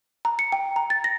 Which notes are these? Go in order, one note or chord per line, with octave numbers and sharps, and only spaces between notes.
A#5
C#7
G5
A#5
A6
A#6